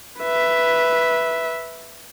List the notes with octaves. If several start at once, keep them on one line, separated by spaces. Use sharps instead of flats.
B4 E5